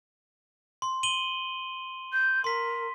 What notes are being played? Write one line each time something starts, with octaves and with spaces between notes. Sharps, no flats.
C6
D#7 F#7 G7
G6
A#4 C6 B6